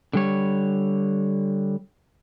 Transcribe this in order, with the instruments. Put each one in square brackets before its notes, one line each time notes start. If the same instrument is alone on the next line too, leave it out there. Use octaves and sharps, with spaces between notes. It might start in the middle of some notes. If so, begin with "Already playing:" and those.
[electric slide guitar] D3 G3 C#5